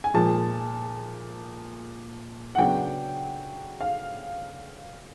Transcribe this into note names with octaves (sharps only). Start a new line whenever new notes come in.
G#5
A#2 F3 G#3 A5
F#5
C#3 F#3 B3 D4 G5
F5